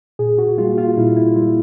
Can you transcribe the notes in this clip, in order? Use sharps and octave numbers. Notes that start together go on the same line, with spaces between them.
A#2 G#4
F#4
G3 A#3 F4
F4
A#2 E4
E4
G3 A#3 F4